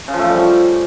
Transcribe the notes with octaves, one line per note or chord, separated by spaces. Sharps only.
C#3
F3
A3
F3
G3